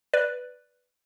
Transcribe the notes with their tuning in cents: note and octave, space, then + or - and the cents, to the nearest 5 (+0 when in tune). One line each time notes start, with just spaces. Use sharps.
B4 +0 D5 +0